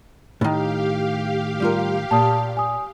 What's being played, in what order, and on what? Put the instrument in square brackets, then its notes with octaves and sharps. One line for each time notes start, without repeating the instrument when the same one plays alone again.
[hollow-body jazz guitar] A2 D#3 [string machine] G4 F5
[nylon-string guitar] G3 F4 A#4
[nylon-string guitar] A#2 [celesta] A5 D#6
[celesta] G#5 D#6